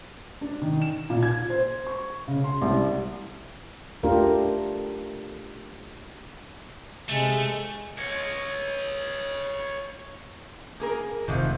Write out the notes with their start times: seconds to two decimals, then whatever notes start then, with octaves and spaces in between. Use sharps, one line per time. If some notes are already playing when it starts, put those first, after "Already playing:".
0.41 D4
0.62 D#3
0.82 E7
1.10 A#2
1.23 G#6
1.50 C5
1.87 C#6
2.28 C#3
2.44 C6
2.62 C2
4.03 A3 D4 F4 G4 A#4
7.10 C3 G#3 A3
7.98 C#5 D#5
10.80 A#3 G#4 A#4
11.28 F1 G#2 C3 D#3 F3 A3